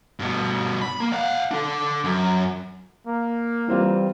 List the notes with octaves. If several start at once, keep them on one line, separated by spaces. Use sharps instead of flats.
G2 B2
B5
A#3
F5 F#5
D4 A4
F#2
A#3
E3 G3 C4 F4